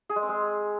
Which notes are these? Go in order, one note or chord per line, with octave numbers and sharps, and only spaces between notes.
G#4
G#3
C4
G#3